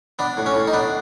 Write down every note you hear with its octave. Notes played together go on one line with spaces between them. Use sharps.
B3 D4
A2
C#4
A2
D#4
B3 D4